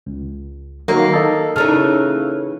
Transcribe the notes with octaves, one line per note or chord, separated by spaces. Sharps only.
C#2
D#3 F#3 A#3
D#4 A4
C#3 E3 D#4 A4 F6